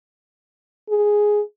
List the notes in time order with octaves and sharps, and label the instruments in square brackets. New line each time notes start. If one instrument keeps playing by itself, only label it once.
[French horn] G#4